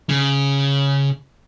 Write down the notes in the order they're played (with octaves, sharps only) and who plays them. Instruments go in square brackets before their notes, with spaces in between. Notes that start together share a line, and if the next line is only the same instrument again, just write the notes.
[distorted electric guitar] C#3